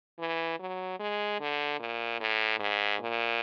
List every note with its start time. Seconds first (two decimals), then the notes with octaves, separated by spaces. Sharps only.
0.19 E3
0.59 F#3
0.99 G#3
1.40 D3
1.79 A#2
2.20 A2
2.59 G#2
3.00 A#2